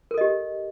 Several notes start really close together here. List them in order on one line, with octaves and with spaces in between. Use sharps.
A#4 A4 D#5 G4